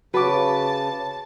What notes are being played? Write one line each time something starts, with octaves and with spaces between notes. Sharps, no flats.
C#3 F#4 B4 A5 D6